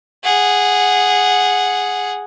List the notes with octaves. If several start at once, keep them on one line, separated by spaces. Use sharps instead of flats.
G#4 F#5